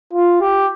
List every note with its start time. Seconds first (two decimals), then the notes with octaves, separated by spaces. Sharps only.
0.13 F4
0.41 G4